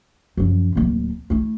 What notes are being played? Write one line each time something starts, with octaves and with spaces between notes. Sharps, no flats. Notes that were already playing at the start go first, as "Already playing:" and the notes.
F#2 F3
D1 A#3
A3 E4